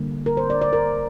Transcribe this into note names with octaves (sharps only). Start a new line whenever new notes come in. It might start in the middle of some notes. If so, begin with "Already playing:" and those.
Already playing: D3 G3 A#3
A#4
C5
D5
D5
A#4